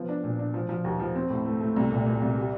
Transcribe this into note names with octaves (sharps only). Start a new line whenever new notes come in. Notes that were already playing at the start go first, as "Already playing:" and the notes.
Already playing: F3 B3
D4
A#2
D4
F3
F3
D#2
F3
C4
A2
A3
A3
C2
A#2
A#2
C2
G3